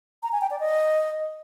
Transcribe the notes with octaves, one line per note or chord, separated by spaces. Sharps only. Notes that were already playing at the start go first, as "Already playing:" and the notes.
A#5
G#5
G5
D5
D#5